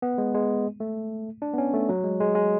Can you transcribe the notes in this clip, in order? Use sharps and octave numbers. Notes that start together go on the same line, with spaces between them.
B3
G#3
G#3
A3
D4
B3
C#4
A3
F#3
G#3
G#3
G#3